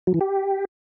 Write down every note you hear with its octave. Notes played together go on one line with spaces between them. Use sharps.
F#3
E3
G4